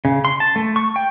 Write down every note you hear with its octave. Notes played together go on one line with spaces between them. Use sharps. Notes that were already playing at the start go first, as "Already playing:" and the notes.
C#3
C6
A5
A3
C#6
G5